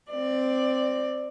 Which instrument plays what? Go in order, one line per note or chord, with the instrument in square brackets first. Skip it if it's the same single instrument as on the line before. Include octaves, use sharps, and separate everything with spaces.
[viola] C4 D5